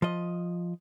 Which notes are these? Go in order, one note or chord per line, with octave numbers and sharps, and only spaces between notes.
F3 D#5